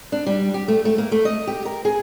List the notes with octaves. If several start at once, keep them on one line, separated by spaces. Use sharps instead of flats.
D4
G3
G4
A3
A3
A#3
A3
D#5
G4
A#4
G#4